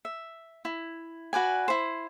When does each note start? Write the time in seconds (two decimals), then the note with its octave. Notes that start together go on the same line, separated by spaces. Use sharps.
0.05 E5
0.65 E4
1.33 F#4 B4 D5 G#5
1.68 E4 C5